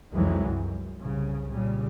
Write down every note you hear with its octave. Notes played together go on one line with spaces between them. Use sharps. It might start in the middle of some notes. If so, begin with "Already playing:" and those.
C2 F2 D#3 E3 F#3 G#3
F#2
C2 C#3
A#2 C#3 G3